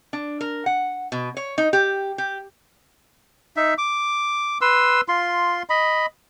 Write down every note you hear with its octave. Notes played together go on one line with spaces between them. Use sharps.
D4
A#4
F#5
B2
C#5
D#4
G4
G4
D#4 E5
D6
B4 C6 E6
F4 C6
D#5 B5